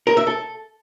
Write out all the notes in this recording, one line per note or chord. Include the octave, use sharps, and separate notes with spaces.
A#4
E5
A4